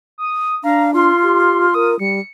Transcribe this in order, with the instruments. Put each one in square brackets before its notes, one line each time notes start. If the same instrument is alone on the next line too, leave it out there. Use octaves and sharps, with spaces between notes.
[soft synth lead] D#6
[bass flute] D4 [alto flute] F5 [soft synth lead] A#5
[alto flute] F4 [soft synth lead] C6
[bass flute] G4
[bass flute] A#4 [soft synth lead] D#6
[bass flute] G3 [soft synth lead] C#7